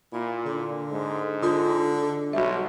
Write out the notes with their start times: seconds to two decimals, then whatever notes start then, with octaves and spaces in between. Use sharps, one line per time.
0.13 A#2 E4
0.46 D3
0.92 G#2
1.43 D3 F4 A4
2.33 B1 G3 F#4 E5